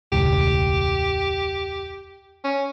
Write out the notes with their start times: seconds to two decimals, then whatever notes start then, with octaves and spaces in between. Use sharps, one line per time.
0.12 E1 C#2 A2 G4
2.44 C#4